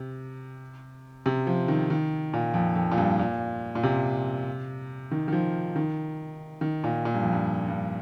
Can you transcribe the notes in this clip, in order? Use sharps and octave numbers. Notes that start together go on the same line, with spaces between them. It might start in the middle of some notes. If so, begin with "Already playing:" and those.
Already playing: C3
C3
F3
D#3
D#3
A#2
F2
F2
A#2
G2
A#2
A#2
C3
D#3
D#3
F3
D#3
D#3
A#2
A#2
G2
F2
G2
G2